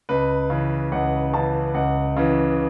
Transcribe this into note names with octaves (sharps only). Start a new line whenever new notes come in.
C#2 B4
C#3 E3
C#2 F#5
C#3 E3 A5
C#2 F#5
C#3 E3